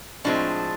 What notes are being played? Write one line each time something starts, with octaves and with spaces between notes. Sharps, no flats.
A2 F3 G#3 C4 D4